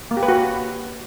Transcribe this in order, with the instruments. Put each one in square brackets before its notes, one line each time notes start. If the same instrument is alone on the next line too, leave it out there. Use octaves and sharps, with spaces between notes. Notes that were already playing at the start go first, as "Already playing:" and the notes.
[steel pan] A#3
G4
B4
F#4